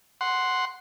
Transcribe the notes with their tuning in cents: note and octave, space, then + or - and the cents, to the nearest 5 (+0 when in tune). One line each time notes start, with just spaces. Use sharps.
F#5 +0 C6 +0